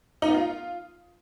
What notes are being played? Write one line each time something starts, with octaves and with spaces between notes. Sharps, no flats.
D#4
B3
F4